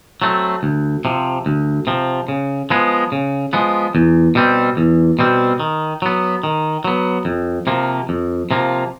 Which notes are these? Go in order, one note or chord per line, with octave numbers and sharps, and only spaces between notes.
F#3 A3 C4
D2
C3 F3
D2
C3 F3
C#3
F3 G#3 B3
C#3
F3 G#3 B3
E2
B2 G3 C4
E2
B2 G3 C4
D#3
F#3 B3
D#3
F#3 B3
F2
C3 F3 A#3
F2
C3 F3 A#3